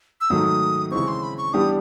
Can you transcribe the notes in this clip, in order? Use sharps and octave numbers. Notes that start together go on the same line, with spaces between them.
E6
G#2 D#3 F#3 A3 D#6
C#3 E3 G#3 C4 C#6
C6
B5
C#6
E3 G3 B3 D4 G4 D#6